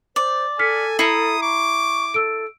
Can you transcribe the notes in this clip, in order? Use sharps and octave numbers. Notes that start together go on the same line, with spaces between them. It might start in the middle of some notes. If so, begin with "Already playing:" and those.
C5 D5
A4 G#5 F6 B6 C#7
E4 A#5 D#6 C7 C#7 D#7
C#6 D6
A4 E6 D7